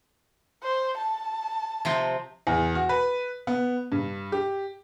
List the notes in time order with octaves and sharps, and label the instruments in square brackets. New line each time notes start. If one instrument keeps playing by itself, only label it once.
[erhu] C5
A5
[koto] C3 F3 C4
[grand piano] E2
F#4
B4
B3
G2
G4